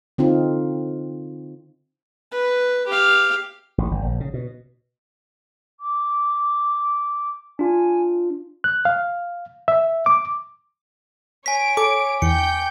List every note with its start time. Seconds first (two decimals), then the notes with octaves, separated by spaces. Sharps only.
0.18 D3 C4 D#4 F4
2.32 B4
2.88 G4 F5
3.78 A1
3.91 G1
4.06 A#1
4.20 C#3
4.34 B2
5.80 D6
7.59 D4 F4 G#5
8.64 F#6
8.85 F5
9.68 E5
10.06 D6
11.46 C#5 G#5 B6 D7
11.77 A4 D6
12.22 E2 G5 G6 C#7